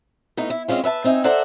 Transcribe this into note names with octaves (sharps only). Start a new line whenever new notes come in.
A2 B3 D#4
E4
G#3 C4 C#4 F4
B4 E5 F5 A5
C4 D#4 E5 G#5
A4 C5 D5 E5 F#5 A#5